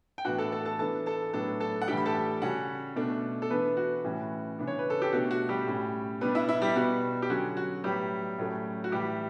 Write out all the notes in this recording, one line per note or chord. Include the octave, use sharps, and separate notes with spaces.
G5
A2 E3 B3 D4 F#4 F#5
A4 A5
A4 A5
A4 A5
E3 B3 D4 A4 A5
A4 A5
A2 F#3 B3 D4 A4 A5
A4 A5
F#5
A2 E3 G3 D4 G4 G5
B5
A4 A5
C#3 G3 C#4 F#4 F#5
B2 A3 D4
A4
E3 B3 D4 B4
F#4
A2 E3 G3 C#4
C#3 E3 B3 D4
C#5
B4
A4
G4
B2 A3 D4 F#4
F#4
G3 G4
A2 G3 C#4
B2 G3 B3 D4 B4
E4 E5
E4 E5
G3 G4
B2 G3 B3 F#4
G4
D3 F#3 C#4 F#4
F#4
A2 F#3 G3 B3 G4
A2 F#3 A3 C#4
F#4
A2 E3 G3 G4